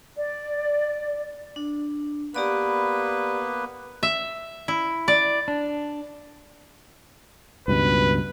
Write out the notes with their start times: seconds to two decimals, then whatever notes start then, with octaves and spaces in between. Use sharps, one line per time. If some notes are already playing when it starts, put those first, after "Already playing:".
0.17 D5
1.56 D4
2.34 A#3 B3 G4 B4 D5 B5
4.03 E5
4.68 E4
5.08 D5
5.48 D4
7.68 C#2 G2 B2 B4